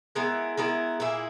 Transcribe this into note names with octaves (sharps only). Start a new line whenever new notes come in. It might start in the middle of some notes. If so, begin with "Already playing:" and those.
G#3 B3 E4 A#4
G#3 B3 E4 A#4
A#2 A#3 E4 G#4